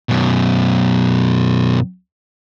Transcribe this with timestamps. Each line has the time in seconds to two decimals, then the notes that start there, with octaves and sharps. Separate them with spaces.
0.09 F#2 B2